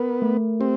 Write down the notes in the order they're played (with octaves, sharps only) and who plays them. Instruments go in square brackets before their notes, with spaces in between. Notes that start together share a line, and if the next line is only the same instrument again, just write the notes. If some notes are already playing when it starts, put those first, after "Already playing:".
Already playing: [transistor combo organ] B3 [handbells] A#4
[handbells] A3
[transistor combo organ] C4 [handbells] G4